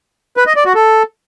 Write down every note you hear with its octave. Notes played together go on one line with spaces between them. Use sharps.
B4
D#5
D5
F#4
A4